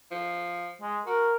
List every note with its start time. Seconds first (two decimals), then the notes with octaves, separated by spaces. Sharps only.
0.11 F3
0.82 G#3
1.06 F#4 A#4